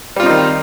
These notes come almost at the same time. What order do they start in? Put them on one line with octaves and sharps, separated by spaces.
G3 F4 C4 D#4 D#3